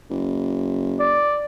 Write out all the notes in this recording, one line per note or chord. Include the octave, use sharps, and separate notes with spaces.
F#1
D5